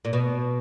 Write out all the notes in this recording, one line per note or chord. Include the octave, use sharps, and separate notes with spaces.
A#2
B2